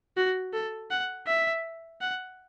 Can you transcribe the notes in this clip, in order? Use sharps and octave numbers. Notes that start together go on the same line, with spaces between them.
F#4
A4
F#5
E5
F#5